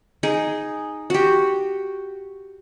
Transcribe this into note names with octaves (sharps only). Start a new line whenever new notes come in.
D#4 G#4
F#4 G4